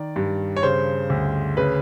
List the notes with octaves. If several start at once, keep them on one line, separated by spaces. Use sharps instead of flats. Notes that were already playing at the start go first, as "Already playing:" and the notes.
Already playing: D#3 D5
G2
C#5
C#3 C5
D2
C#3 B4